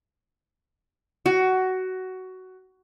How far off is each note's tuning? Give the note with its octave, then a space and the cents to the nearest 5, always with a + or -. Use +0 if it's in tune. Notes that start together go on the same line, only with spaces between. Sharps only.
F#4 +15